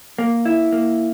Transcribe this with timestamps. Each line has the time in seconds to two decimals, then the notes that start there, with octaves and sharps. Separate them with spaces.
0.19 A#3
0.45 E4
0.72 A#3